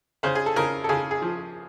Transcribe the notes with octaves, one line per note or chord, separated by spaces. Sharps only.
C#3 C5
G#4
A4
C#3 A#4
A4
C#3 G#4
G#4
F3